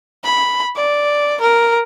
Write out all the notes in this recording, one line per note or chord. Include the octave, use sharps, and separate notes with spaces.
B5
D5
A#4